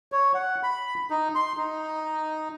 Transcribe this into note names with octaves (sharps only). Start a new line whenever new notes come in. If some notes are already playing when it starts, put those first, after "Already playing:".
C#5
F#5
B5
D#4
C6
D#4